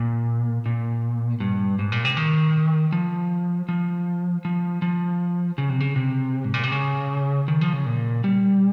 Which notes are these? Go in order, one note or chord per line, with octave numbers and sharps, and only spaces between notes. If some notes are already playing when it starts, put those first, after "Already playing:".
Already playing: A#2
A#2
G2
G#2
A#2
C3
D#3
F3
F3
F3
F3
C#3
C3
C#3
C3
G#2
A#2
C3
C#3
D#3
F3
C#3
A#2
G3